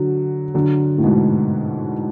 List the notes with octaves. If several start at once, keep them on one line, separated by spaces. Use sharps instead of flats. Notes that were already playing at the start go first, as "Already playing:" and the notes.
Already playing: D3 F#3
D3 F#3
A2
G#2 B2